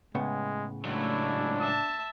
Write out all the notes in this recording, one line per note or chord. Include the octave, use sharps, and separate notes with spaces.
A2 C#3 G#3 B3
C#2 F#3 A3 D4 E4
E5 A5